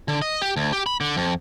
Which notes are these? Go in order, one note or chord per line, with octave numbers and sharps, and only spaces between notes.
D3
D#5
G4
D2
G4
B5
D3
F2